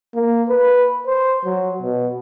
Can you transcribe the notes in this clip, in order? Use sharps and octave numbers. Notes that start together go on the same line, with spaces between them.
A#3
B4
C5
F#3
B2